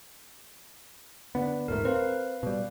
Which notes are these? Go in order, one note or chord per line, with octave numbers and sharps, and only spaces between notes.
D3 B3
D#1 G#2 A3 A#4
C4 B4 F5
B2 G3